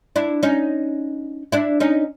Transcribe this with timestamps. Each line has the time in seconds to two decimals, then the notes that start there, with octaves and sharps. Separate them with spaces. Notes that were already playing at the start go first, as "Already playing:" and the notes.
0.16 D4 E4
0.43 C#4 D#4
1.52 D4 E4
1.80 C#4 D#4